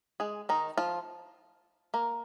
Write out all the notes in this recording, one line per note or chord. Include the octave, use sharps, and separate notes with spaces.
G#3 G#4
D#3 D#4
F3 F4
A#3 A#4